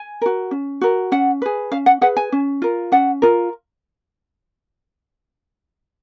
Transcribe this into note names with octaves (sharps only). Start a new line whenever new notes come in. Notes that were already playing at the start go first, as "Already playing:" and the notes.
Already playing: G#5
F#4 A#4
C#4
F#4 A#4
C#4 F#5
G#4 B4
C#4 F5
F#5
G#4 B4 F#5
G#5
C#4
F4 A#4
C#4 F#5
F4 A#4